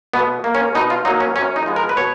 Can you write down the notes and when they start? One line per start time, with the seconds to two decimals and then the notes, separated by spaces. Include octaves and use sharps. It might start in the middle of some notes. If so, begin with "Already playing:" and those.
0.14 B2 B3
0.44 A#3
0.55 C#4
0.75 B2 D#4
0.90 F4
1.05 F#3 D#4
1.08 A#3
1.20 C#4
1.36 F#2 C#4
1.56 D#4
1.66 F3 G#3 B3
1.76 A#4
1.89 B4
1.97 B2 C#5